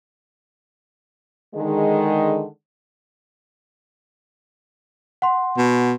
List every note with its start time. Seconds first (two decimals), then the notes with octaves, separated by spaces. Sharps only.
1.55 D3 D#3 G#3
5.22 F#5 C6
5.57 B2